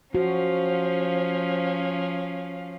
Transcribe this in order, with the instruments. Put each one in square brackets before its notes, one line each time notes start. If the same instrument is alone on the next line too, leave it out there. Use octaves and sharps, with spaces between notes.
[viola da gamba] F3 [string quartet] C#4 F5 [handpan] F#4 [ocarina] C5